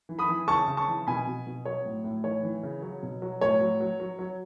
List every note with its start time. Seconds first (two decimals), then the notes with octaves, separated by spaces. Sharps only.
0.09 E3
0.19 B5 D#6
0.29 E3
0.48 C#3 A5 C#6
0.68 C#3
0.77 A5 C#6
0.88 E3
1.07 B2 G#5 B5
1.27 B2
1.47 B2
1.65 F#3 C#5
1.85 A2
2.04 A2
2.24 E3 C#5
2.43 E3
2.63 C#3
2.82 F#3
3.03 B2
3.22 F#3
3.41 A2 C#5
3.60 F#3
3.81 F#3
4.00 F#3
4.19 F#3